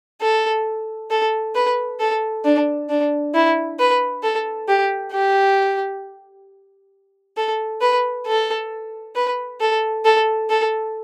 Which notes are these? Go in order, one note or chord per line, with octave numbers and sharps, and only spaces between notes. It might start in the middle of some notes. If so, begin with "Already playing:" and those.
A4
A4
B4
A4
D4
D4
E4
B4
A4
G4
G4
A4
B4
A4
B4
A4
A4
A4